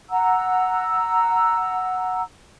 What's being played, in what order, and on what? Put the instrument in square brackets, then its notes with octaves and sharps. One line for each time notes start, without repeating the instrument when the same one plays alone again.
[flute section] F#5 A#5 E6